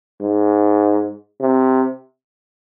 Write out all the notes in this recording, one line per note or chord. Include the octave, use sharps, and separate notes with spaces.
G#2
C3